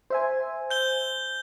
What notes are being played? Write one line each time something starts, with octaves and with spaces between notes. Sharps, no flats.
C5 E5 G#5
G6 G7